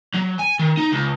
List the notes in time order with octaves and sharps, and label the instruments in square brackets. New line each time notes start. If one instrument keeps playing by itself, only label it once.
[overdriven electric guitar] F#3
G#5
D#3
D#4
C#2